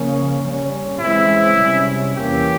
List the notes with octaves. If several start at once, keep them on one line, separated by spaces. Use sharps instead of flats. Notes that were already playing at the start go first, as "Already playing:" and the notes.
Already playing: C#3 F3 A#3 C#4
G2 G3 C#4
C#3 E3 G#3 C4 E4
C3 G3 C#4
E2 E3 A#3 C#4 G4